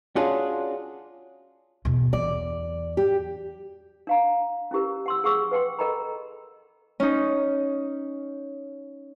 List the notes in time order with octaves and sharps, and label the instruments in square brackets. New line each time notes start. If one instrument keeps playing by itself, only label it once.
[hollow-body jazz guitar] C#4 D4 F4 F#4 G#4
[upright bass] E2 B2
[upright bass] E2 [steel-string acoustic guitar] D5
[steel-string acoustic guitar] G4
[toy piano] D4 F5 A#5
C#4 E4 G4 A#4
F#5 C6 E6
G#4 F#5 C#6 E6
B4 F#5 G5 C6
A4 A#4 D#5 G5 A#5 B5
[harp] C#4 D#4